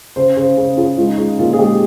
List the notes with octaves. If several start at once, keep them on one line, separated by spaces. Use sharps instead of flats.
C#3 C5
C#3 C5
C#3 G#4
C#3 F4
G#3 F4
D#4
G#3 F4
A#2 F4
G#4
G#3 G4